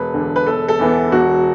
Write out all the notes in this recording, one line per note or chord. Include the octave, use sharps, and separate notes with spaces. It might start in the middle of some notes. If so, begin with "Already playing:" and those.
Already playing: E1 B4
E2 D3
B4
E1 A4
A4
E2 E3 B3
E1 F#4